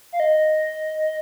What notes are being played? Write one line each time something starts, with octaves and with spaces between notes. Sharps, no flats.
F5
D#5